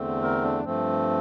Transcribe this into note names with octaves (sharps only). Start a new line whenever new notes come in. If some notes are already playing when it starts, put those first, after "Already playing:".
Already playing: E2 D3 A3 C4
A#4
D4
G2 F3 A3 C4